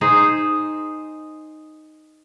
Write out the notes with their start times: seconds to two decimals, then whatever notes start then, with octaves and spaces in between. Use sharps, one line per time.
0.01 D#4 G#4 C5